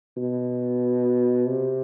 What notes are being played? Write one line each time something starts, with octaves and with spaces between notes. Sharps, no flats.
B2
C3